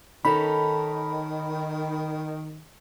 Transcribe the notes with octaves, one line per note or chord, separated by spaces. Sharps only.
D#3 C#4 D#4 A4 B5